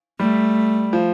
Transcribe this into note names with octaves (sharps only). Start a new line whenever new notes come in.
G3 A3
F3